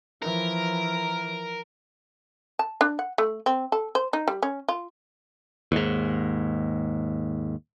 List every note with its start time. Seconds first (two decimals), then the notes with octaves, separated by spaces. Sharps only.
0.22 E3 F3 A#4
2.59 A5
2.81 D4
2.99 F#5
3.18 A3
3.46 C4
3.72 A4
3.95 C5
4.13 D#4
4.28 G3
4.42 C#4
4.69 F4
5.72 D#2 G#2